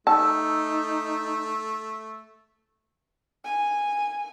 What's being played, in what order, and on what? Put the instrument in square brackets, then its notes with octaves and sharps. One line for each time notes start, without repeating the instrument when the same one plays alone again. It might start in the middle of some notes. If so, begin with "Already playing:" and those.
[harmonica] A3 [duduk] D#4 [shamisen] A5 [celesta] E6
[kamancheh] G#5